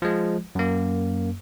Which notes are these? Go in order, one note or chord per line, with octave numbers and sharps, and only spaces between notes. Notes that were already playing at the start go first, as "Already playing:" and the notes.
F3 G#3
F#2 A#3